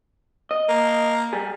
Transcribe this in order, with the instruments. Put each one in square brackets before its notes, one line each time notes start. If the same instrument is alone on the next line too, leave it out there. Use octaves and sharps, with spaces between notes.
[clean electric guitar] D#5
[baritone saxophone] A#3
[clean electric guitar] G3 G#4